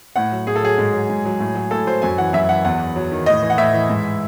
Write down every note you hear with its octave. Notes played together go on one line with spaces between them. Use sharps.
A2 F#5
F#3
A2 G#4
A4
F#3 G#4
G#2
F#3
G#2
F#3
A2
F#3
A2 A4
F#3 C5
F#2 G#5
E3 F#5
F#2 E5
E3 F#5
E2 F#5
E2
F#3
D#3
A2 D#5
E3
F#5
A2 E5
E3
G#2